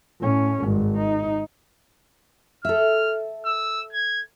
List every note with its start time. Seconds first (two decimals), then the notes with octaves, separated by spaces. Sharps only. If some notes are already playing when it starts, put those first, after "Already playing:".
0.20 A2 C#4
0.64 G#1 G2
0.97 D#4
2.65 A4 E5 F6
3.45 E6
3.92 G#6